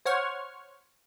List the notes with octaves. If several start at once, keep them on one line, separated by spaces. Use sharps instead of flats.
C5 C#5 F#5 C#6 F6